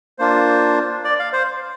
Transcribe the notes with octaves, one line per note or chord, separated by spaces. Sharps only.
A#3 D4 F4 C5
D5
F5
C5